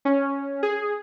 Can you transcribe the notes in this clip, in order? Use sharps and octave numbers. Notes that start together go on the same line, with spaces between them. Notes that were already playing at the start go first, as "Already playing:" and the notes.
C#4
G#4